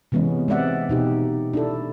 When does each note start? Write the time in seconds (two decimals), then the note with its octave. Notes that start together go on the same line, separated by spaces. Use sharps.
0.12 C3 E3 G#3 B3 C#4
0.48 G#3 C4 D5 E5 F#5
0.89 B2 D#4 G4
1.54 D4 E4 A4